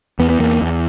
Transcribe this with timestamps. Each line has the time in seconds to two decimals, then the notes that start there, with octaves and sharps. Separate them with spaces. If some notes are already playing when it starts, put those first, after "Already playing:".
0.19 E2 B3
0.30 B3
0.40 E2 A#3
0.61 E2